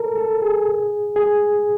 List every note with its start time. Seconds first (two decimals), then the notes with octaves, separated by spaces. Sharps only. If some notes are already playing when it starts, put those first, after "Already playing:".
Already playing: A4 A#4
0.18 A4
0.42 G#4
1.16 G#4